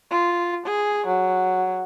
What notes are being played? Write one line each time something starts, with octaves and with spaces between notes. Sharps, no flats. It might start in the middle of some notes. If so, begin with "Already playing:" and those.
F4
G#4
F#3